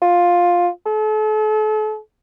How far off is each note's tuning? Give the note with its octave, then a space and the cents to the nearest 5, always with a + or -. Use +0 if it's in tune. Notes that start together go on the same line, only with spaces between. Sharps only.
F4 +10
A4 -40